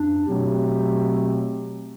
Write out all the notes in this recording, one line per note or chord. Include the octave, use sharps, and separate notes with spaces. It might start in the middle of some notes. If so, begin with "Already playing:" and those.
Already playing: F#2 D4
B2 F#3 A3 C4 G4